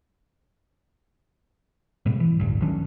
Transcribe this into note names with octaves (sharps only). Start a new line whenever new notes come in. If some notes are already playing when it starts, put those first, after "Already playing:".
G#2 B2 G3
E3
A1 D2 G2
D#3 F#3 C#4 D4